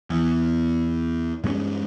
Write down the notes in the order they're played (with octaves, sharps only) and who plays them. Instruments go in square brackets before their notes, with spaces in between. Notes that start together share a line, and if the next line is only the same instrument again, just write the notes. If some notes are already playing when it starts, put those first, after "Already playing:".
[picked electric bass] E2
G2 G#3 A3 C#4